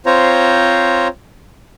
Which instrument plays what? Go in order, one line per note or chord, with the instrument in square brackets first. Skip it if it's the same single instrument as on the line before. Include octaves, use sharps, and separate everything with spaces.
[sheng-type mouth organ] C4 F4 C5 C#5 A#5